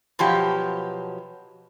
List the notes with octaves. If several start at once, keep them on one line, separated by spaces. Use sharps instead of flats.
B2 F3 F#3 G4